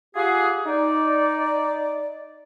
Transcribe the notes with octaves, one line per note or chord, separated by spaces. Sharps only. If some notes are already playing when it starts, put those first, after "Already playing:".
F4 G4 G#4 F#5
D#4 D5